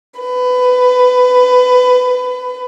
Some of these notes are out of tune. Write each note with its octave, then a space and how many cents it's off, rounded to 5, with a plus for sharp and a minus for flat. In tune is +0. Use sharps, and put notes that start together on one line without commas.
B4 +20